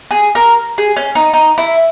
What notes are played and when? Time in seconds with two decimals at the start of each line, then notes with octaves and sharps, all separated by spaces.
0.11 G#4
0.35 A#4
0.78 G#4
0.96 C#4
1.15 D#4
1.33 D#4
1.58 E4